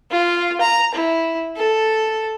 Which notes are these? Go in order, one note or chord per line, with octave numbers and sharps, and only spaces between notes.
F4
A#5
E4
A4